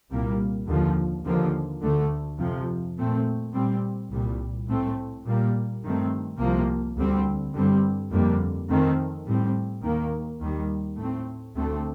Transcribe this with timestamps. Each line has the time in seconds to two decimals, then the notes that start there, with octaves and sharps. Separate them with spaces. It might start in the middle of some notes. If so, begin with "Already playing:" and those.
0.10 C2 A#2 G3 A#3
0.67 D#2 D3 F3
1.25 D#2 D3 F3 A#3
1.82 D2 D3 A3
2.39 F2 C3 F3
2.97 A#2 A3 C4
3.53 A#2 G3 C4
4.11 C2 A#2 G3
4.68 A2 A3 C4
5.25 A#2 G3 A#3
5.83 G2 D#3 A3 C4
6.39 C2 C3 F3 A#3
6.96 D2 D3 G3 C4
7.54 G2 D3 G3 C4
8.11 F2 D3 G3 A#3
8.68 F2 D#3 A3 C4
9.26 A2 G3 C4
9.83 D#2 D#3 A#3
10.41 D#2 D#3 G3
10.97 A2 A3 C4
11.55 D2 D3 A3 C4